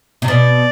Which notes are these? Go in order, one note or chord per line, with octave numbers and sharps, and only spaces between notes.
C3
B2 D5